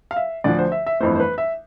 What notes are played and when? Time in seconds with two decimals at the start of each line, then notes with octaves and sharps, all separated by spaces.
0.11 F5
0.16 E5
0.44 D2 D3 F3 D5
0.59 C5
0.72 E5
0.86 E5
1.00 G1 F2 E3 A3 C5
1.15 C5
1.20 B4
1.38 E5